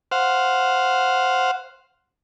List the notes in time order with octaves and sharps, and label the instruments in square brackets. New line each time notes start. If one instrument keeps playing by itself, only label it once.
[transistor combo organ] C5 F5 F#5